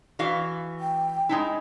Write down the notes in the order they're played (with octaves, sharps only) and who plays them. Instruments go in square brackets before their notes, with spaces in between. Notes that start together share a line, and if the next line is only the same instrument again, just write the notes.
[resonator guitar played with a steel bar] E3 F#4 F5
[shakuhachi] G5
[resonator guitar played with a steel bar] G#3 D#4 E4